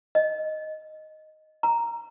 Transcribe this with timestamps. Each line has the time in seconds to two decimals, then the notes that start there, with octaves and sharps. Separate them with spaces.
0.15 D#5
1.63 A#5